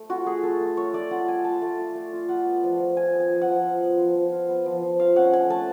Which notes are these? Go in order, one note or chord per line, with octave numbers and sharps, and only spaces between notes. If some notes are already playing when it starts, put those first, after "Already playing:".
Already playing: A3
F4 F#4
A3 G#4
F4 A4
A3
F4 C#5
A3 D5
F4 F#5
A3 G#5
F4 A5
A3
F4
A3
F4
F4 F#5
B3
F3
F3
F4 G#5
B3
G#5
F3
F#5
F3
F4
B3
F3
F3
F4
B3
F3
F3
F4 F5
C#4 F#5
A3 G#5
A3 A5